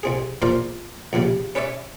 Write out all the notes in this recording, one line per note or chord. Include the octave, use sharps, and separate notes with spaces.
C2 C4 G#4
E2 A#2 A#4 C5 D5 F5
A#1 E2 C#3 G3
C#4 B4 C#5 D5 E5